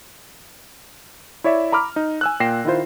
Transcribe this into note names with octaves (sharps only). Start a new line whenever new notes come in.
E4 C#5 D5 E5
A#5 B5 D6 F6
D#4
G#5 E6 F#6
A#2 G5 A#6 C7 E7
D#3 E4 F4 C5